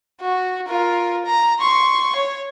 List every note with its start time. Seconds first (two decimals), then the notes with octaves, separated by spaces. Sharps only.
0.22 F#4
0.68 F4 A#4
1.26 A#5
1.60 C6 C#6
2.16 C#5